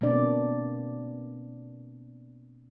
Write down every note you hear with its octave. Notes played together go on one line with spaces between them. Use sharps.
B2 A#3 C4 D4 D5